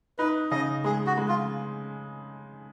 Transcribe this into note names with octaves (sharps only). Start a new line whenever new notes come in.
D#4 B4
C#3 D#5
G#3 G#4
F#4
G#3
F4